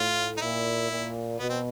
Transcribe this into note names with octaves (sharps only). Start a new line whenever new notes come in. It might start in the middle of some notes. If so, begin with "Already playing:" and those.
Already playing: A2 F4
D#4
A#2 E4
A#2
B2 B3
C4